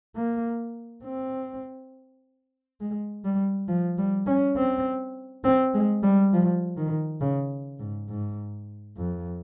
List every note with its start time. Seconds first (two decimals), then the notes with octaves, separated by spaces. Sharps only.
0.16 A#3
1.04 C4
2.81 G#3
3.25 G3
3.68 F3
3.98 G3
4.27 C#4
4.57 C4
5.44 C4
5.74 G#3
6.03 G3
6.33 F3
6.77 D#3
7.21 C#3
7.80 G#2
8.09 G#2
8.97 F2